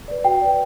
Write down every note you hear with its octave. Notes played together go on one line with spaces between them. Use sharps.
B4 D5
F#4 G5
B4 D5